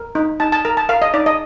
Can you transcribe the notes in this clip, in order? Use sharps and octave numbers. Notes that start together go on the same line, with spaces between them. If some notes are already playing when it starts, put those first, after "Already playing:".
Already playing: A#4
D#4
D#4 A5
A5
A#4 A#5
A5
A#4 F5
D#5
D#4 D5
D#5